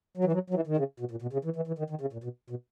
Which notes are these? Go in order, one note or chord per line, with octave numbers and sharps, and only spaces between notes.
F#3
E3
F#3
F#3
E3
D#3
C#3
B2
A#2
B2
C#3
E3
E3
E3
D#3
D#3
C#3
A#2
B2
B2